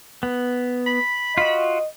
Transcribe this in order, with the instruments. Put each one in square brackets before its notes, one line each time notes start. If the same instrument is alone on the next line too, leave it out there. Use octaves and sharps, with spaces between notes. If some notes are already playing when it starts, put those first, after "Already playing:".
[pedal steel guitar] B3
[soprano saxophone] B5
[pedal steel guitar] F4 F#4 [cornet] D#5